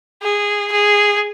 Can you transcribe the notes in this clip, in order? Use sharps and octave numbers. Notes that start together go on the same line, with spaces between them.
G#4
G#4